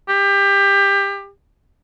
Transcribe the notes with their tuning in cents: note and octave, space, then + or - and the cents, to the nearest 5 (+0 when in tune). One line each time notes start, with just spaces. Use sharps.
G4 +25